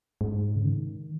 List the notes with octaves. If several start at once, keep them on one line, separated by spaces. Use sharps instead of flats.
G#2
C#3
D#3